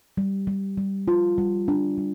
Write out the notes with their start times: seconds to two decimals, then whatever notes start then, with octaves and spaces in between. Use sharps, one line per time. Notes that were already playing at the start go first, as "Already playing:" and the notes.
0.17 G3
0.47 G3
0.78 G3
1.08 F4
1.38 G3
1.68 D4
1.98 G3